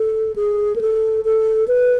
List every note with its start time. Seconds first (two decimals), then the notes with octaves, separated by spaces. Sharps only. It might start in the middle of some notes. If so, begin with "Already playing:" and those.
Already playing: A4
0.36 G#4
0.76 A#4
0.81 A4
1.25 A4
1.68 B4